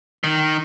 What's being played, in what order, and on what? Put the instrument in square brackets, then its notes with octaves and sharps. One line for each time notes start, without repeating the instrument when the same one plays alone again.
[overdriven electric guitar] D#3